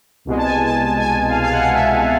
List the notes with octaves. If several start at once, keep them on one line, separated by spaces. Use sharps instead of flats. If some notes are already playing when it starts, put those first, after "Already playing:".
C2 B2 G#3
A5
G#5
A5
A5
G#5
F5
F5
F#5
F5
E5